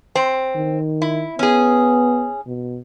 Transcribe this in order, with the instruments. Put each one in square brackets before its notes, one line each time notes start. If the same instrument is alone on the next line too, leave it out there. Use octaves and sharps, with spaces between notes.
[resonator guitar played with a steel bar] C4
[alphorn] D#3
[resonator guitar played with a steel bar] E4
[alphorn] B3 [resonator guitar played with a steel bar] C#4 G#4
[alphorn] B2